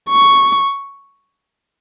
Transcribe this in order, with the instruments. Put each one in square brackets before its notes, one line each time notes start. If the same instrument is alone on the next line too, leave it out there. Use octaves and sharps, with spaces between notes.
[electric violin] C#6